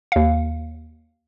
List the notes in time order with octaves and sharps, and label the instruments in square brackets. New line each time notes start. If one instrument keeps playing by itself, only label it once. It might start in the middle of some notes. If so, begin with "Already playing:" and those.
[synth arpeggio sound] D#2 F5